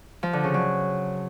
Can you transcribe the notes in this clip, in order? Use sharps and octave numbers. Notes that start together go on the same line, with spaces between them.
F3
D3
C#3
F#3